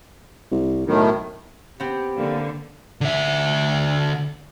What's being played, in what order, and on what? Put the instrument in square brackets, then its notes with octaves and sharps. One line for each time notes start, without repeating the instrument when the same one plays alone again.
[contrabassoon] C2
[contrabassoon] B1 [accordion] A2 D#3
[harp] B3 C4 [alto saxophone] G4
[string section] D3 [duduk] A#3
[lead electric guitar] D3 E5